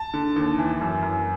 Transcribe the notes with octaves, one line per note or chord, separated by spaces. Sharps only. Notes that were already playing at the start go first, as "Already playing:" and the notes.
Already playing: A5
D3
D#2
E3
F#2
F#2